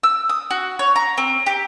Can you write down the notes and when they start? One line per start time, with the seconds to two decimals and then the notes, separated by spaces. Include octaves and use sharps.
0.03 E6
0.29 D#6
0.50 F#4
0.79 C#5
0.96 A#5
1.18 C4
1.46 G4